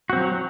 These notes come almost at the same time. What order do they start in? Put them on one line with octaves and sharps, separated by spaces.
F#4 C4 F#3